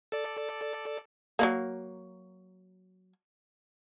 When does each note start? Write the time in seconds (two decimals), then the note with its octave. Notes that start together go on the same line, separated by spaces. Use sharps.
0.12 A4 D5
1.39 F#3 G#3 A#3